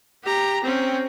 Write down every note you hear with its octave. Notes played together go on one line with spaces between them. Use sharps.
G4 A#5
C4 C#4